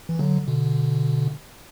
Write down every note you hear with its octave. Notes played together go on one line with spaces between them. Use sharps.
E3
D3 F#3
B2 D3